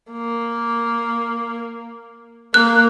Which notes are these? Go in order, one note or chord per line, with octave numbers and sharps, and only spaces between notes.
A#3
A#3 F#6